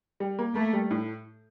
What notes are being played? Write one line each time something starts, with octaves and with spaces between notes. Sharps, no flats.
G3
A#3
A3 A#3
G3
A2